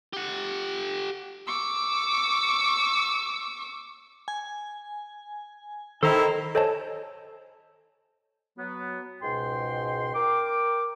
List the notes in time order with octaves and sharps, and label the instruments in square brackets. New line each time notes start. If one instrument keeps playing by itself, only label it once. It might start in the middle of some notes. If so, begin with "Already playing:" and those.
[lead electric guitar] G4 F#5
[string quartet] C#6 D6 E6
[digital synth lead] G#5
[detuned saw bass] D#3 [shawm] E4 [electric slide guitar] A4 A#5 [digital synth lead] C5
[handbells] A4 C5 C#5 D#5 G#5 A5
[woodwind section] F#3 B3
C#2 G#2 B2 G5 C6
A#4 G5 D6